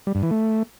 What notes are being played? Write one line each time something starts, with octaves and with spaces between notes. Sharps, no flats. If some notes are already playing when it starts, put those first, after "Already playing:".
G3
G2
E3
A3